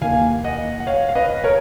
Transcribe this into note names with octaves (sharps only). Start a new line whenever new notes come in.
D#2 D#3 A#3 F5 G#5
D#5 F#5
F#5
C#5 F5
F5
B4 D#5
A#4 C#5